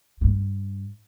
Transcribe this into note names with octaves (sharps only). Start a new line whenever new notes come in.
G2